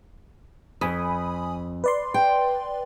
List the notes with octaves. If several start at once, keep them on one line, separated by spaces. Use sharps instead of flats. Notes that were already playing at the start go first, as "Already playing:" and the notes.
F2 G#5 B5 D#6
B4 D5 C6
G5